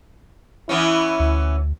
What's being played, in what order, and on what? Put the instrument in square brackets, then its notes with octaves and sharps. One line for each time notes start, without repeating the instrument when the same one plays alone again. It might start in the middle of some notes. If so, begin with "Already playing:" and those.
[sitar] E3 B3 C#4 [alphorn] E4
[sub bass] D2